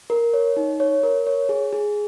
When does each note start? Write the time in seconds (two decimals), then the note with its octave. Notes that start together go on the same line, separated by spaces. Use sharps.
0.10 A#4
0.34 C#5
0.57 D#4
0.80 C#5
1.03 A#4
1.27 C#5
1.49 G#4
1.73 G#4